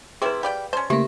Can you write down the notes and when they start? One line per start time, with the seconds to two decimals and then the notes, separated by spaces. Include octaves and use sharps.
0.22 C3 C4 E4 G#4 B4
0.43 G4 D5 F5 G5 B5
0.73 C#4 C5 D5 G#5 A5
0.90 C#3 A3 A#3 E4 G4 C5